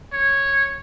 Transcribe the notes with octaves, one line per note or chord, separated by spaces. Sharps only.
C#5